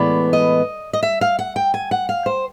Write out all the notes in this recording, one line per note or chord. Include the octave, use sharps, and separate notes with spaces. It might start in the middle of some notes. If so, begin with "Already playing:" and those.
Already playing: A2 E3 G#3 B3 D5
D#5
D#5
E5
F5
F#5
G5
G#5
F#5
F5
C5